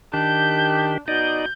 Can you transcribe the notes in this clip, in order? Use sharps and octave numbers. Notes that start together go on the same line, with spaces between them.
D#3 D4 G4 G6
B2 D#4 D5 D#5 G6